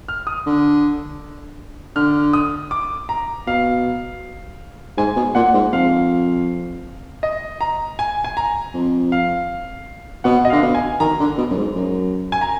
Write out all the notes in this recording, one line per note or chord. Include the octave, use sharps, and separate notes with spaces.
F6
D#6
D3
D3 F6
D#6
D6
A#5
B2 F5
G#2 G#5
B2
A#2 F#5
G#2
F2 F5
D#5
A#5
G#5
G#5
A#5
F2
F5
B2 F#5
D#5
D3 F5
B2
G#5
D#3 A#5
D3
B2
F#2
G#2
F#2
G#5
A#5